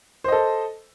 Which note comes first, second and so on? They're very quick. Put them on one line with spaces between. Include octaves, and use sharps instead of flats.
C5 D#5 A4